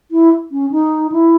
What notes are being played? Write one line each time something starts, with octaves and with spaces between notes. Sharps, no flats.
E4
C#4
D#4
E4